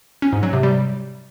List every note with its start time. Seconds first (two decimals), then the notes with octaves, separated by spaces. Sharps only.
0.22 C#4
0.33 G#2
0.43 F#3
0.53 C3
0.63 G3